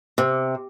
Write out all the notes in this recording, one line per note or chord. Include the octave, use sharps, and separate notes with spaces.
C3